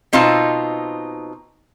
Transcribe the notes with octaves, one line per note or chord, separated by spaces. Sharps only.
B2 C4 D#4 F4 A5